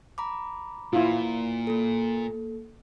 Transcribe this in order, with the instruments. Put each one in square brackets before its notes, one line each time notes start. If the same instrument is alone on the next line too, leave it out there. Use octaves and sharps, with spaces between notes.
[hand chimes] A#5 B5 D6
[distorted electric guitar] A#2 [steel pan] E4 F4
[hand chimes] A#3 A4